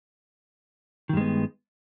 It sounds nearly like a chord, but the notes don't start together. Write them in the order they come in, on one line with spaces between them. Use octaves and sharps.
D#3 G2 G#3 B3